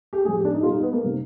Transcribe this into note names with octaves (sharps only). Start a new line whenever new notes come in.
G4
A2 F3 G#4
G4
D4
D#4
B2 G3 F4
D#4
B3
A#3
C3 D#3 G3